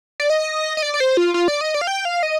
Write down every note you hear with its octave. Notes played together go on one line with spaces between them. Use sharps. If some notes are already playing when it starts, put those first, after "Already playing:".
D5
D#5
D#5
D5
D5
C5
F4
F4
D5
D#5
D5
F5
G5
F5
D#5